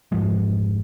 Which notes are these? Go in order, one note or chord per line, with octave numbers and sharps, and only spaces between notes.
F1 G#2 F3 G#3